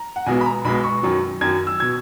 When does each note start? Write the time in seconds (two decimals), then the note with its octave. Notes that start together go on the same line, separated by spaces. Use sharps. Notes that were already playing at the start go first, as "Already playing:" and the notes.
Already playing: A#5
0.16 F#5
0.26 B1 B2 G#3 B3 G#5
0.41 B5
0.46 A#5
0.65 B1 B2 G#3 B3 B5
0.84 C#6
1.03 F#2 D#3 F#3
1.41 F#2 D#3 F#3 G#6
1.67 E6
1.80 B2 G#6